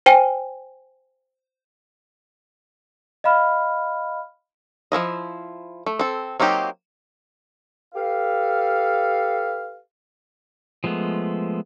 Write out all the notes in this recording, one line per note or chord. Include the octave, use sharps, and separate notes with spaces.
C5 G5 G#5 D#7
D#5 F5 B5 F6
F3 C4 E4 D#5
A3
C4 A4
F#3 A#3 C4 D#4 G4
G4 A4 B4 F5
F3 G#3 A3 B3